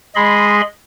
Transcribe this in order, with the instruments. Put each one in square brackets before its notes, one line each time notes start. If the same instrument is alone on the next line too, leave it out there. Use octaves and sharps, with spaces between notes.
[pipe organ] G#3 G#4 D#5 B5 C6